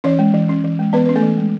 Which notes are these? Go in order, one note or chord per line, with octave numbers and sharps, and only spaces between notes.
E3 C#4 C#5
G#3
E3
C#4
E3
G#3
E3 B3 B4
C#4 B4
A3 A4
E3
G#3